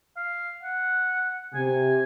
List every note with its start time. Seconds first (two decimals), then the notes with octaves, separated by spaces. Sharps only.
0.17 F5
0.63 F#5
1.54 C3 G#5